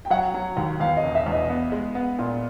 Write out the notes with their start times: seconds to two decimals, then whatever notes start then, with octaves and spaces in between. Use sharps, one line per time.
0.05 G5
0.10 F#3 F#5
0.34 F#3
0.57 D#2
0.80 E2 F5
0.97 D#5
1.04 E1
1.15 E5
1.26 E2
1.33 D#5
1.49 B3
1.72 G#3
1.95 B3
2.19 A#2